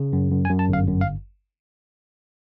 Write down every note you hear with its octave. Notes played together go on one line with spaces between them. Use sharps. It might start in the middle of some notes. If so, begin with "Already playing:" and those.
Already playing: C#3
F#2
F#2
G#5
F#2
A5
G1 F5
F#2
F5